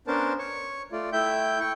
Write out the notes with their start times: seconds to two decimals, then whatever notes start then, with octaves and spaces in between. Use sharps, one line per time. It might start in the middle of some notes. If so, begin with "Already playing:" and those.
0.07 B3 C#4 D4 A#4 C5 A5
0.39 C#5 C#6
0.92 A3 F4 D5
1.13 A3 E4 E5 G5 G6
1.60 E4 G5 C#6